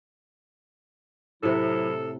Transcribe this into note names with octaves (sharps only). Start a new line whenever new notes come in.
A2 C3 F#3 E4 A4 F#5